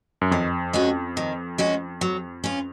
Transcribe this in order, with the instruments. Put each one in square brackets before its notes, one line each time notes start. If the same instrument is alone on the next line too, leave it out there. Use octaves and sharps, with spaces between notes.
[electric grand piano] F#2
[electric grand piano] F2 [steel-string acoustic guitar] D#3
[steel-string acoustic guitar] G#3 C#4 F#4
D#3
G#3 C#4 F#4
F#3
C#4 F4